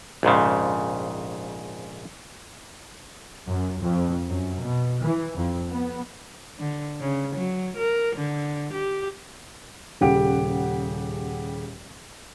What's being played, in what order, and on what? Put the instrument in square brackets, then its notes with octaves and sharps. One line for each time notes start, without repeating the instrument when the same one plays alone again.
[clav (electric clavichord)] A#1 F2 G#2 C#3
[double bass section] F#2
F2
F#2
B2
E3
F2
B3
[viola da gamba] D3
C#3
F#3
A#4
D3
G4
[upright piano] D#1 C#3 G4 F#5 D7